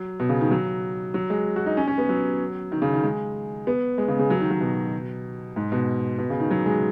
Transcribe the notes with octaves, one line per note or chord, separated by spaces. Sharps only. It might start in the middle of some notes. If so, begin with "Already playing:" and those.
Already playing: F#3
B2
C#3
D#3
F#3
F#3
G#3
F#4
D#4
C#4
C#4
B3
F#3
D#3
C#3
D#3
G#3
B3
G#3
C#3
C#3
F#3
D#3
F#3
B2
G#2
B2
B2
C#3
D#3
F#3
G#3